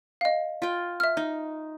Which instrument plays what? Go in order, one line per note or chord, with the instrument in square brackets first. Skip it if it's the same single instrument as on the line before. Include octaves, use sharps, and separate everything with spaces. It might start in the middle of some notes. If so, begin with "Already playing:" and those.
[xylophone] D#5 F5
[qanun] F4 G5
[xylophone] E5 F6
[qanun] D#4